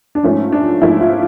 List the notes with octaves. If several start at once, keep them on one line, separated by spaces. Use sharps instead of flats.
D4
G#2 F3 A3 C#4
D4
G#2 F3 A3 E4
F4